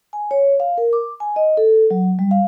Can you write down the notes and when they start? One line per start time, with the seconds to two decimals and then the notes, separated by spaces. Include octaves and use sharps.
0.13 G#5
0.31 C#5
0.60 F5
0.78 A#4
0.93 D6
1.20 G#5
1.36 D#5
1.57 A4
1.91 F#3
2.19 G3
2.31 F5